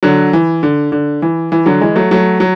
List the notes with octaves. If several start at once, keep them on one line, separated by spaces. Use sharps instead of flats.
D3 F#3
E3
D3
D3
E3
E3
D3 F#3
E3 G#3
F#3 A3
F#3 A3
F#3